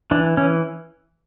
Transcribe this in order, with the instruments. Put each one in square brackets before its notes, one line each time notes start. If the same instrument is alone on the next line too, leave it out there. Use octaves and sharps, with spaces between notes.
[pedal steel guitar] E3 D4
E3 C#4